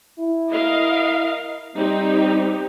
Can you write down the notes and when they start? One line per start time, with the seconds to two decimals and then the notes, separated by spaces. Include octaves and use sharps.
0.19 E4
0.50 A#4 D#5 F5
1.77 G3 C4 D#4 G4